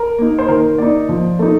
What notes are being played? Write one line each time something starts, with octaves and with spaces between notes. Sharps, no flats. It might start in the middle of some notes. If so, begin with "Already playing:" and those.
Already playing: A#4
A#3 D#4
C5
D#3 A#4
A#3 D#4 D5
F3
A3 D#4